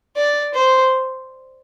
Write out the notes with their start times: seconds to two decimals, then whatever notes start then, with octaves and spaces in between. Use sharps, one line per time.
0.16 D5
0.54 C5